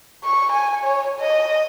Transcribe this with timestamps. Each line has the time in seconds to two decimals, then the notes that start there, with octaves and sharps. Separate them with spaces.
0.24 C#6
0.53 G#5
0.84 C#5
1.20 D#5